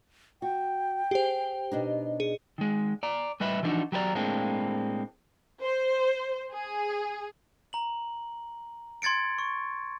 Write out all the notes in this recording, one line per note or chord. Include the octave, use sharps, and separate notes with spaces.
F#4 G5
G4 G#4 C5
B2 D4 D#4
G#4
D#3 G#3
D5 A#5
A2 G3 B4 D#5 E5 B5
E3 F3 G3 D4 D#4 F#4
F#3 G4 B4 D5 A#5
A2 G#3 A#3 C4 D4
C5
G#4
A#5 F#7
C6 G#6 A6 C#7 D7
C#6